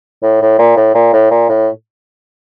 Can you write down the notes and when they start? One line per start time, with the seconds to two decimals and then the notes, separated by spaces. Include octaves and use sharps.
0.23 A2
0.41 A2
0.59 A#2
0.77 A2
0.94 A#2
1.13 A2
1.31 A#2
1.49 A2